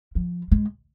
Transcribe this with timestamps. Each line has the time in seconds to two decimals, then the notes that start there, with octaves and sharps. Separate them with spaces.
0.15 F3
0.51 G#3